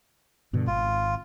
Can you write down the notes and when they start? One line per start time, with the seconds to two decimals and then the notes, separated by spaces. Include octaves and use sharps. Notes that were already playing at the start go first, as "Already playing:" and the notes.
0.53 G2 B2 D3
0.67 G#1 F4